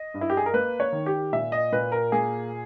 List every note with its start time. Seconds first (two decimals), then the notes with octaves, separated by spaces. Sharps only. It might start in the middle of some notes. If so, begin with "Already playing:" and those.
Already playing: D#5
0.14 G2
0.21 E4
0.30 G4
0.37 G#4
0.46 A#4
0.54 A#3 B4
0.80 C#5
0.93 D#3
1.06 G4
1.33 A#2 E5
1.52 D#5
1.72 A#2 B4
1.92 A#4
2.12 A#3 G#4